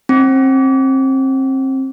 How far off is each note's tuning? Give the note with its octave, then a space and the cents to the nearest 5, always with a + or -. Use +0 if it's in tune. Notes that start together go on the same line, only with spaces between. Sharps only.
C4 +30